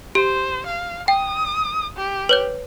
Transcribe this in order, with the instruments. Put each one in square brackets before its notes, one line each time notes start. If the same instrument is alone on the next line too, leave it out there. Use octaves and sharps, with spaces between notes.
[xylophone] G4 [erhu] C5
[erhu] F5
[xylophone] G5 [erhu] D#6
[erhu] G4
[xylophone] B4 C#5 G6